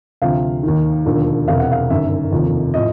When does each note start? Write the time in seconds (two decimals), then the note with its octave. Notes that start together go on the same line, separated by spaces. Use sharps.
0.22 D2 C3 F3 F5
0.63 D#2 D#3
1.06 E1 D#2 D3 F3
1.48 E1 E2 C3 F5
1.60 F#5
1.71 F5
1.90 G1 F#2 D#3 E5
2.32 F1 D#2 C#3 F3
2.74 A2 F3 D#5